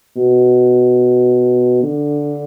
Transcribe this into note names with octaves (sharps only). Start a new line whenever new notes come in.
B2
D3